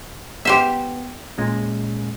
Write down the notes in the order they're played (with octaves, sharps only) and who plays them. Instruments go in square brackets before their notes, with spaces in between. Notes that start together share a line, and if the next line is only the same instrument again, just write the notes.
[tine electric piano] B3 [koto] G4 C5 E5
[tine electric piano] A#2 G#3 C#4